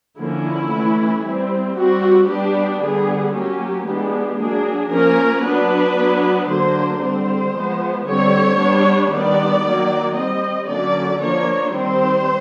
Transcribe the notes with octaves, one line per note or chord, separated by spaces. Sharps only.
D3 F3 A#3 C#4 E4
E3 A3 C#4
G3 C4
G3 C4 F#4
G3 B3 D4 G4
D3 G3 B3 G#4
F#3 A#3 C#4 G4
E3 G#3 B3 D4 G4
F#3 A#3 D4 G#4
F3 A#3 C#4 A#4
F#3 B3 D4 B4
F#3 B3 D4
D3 F#3 A#3 D4 C5
D3 G3 C4 C5
F3 G#3 B3
D3 G3 C4 C#5
G3 B3 D4
D#3 G3 B3 D4 D5
D#3 F#3 A#3
G3 C4 D#5
D3 F#3 A#3 C#4 D5
F3 A#3 D4 C#5
D#3 G3 C4 C5